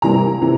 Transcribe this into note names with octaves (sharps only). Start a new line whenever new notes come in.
C3 E3 G3 A#3 A#5
C3 E3